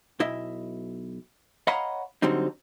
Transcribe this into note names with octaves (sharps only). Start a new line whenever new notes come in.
B1 E4 D#5 E5
C#5 D#5 F5 F#5 A#5 B5
D3 F#3 G3 C4 D#4